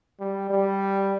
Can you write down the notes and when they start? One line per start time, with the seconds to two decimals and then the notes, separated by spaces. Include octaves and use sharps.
0.20 G3
0.50 G3